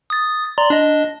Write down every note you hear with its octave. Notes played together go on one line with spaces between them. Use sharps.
D#6 A6
D5 A#5 C6
D4 D#5